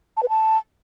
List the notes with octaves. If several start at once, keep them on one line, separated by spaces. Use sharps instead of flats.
A5
B4
A5